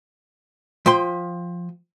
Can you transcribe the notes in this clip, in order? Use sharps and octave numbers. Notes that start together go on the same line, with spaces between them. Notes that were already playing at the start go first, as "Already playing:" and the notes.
F3 G5 C6